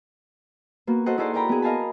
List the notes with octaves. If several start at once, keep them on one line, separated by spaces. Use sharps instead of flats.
A#3 B3 F#4
F#4 A4 C5 D#5 F#5
D#4 E4 G#4 A4 C5 D5
A#4 D5 F#5 G5 A#5 B5
B3 G#4
A#4 D#5 F5 G#5 A5 B5